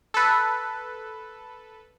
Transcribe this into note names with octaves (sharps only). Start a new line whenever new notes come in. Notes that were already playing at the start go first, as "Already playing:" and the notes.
A4 B4